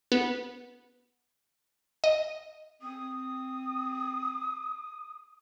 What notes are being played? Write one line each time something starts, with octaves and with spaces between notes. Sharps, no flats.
B3
D#5
C4 D#6